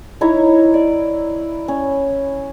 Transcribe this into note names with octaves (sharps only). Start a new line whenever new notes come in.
D#4 E4 C#5 A#5
D5
C#4